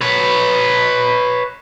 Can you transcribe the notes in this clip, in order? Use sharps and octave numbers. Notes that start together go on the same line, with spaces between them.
B4 C#5